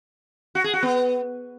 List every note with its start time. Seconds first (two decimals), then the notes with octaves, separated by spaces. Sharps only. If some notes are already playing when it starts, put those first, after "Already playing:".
0.55 F#4
0.64 G#4
0.73 F#4
0.83 B3